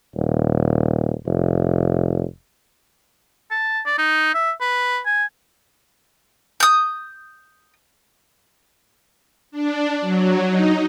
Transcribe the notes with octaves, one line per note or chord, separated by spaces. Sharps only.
D#1
F1
A5
D5
D#4
E5
B4
G#5
D#6 G6
D4
F#3
D#4